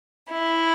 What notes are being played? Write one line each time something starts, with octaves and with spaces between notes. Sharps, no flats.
E4